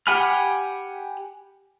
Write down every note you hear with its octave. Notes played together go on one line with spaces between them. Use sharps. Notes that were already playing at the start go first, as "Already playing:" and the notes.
G4 F#5 G#5 B5 F6